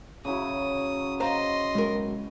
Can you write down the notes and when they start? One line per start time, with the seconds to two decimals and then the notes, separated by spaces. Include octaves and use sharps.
0.25 C#3 F#3 E4 D#6
1.20 C5 D#5 F5 A#5 C6
1.75 B1 G#3 A#4